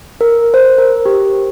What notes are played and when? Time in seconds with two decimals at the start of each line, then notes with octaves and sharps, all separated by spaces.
0.21 A#4
0.54 C5
0.78 A#4
1.06 G4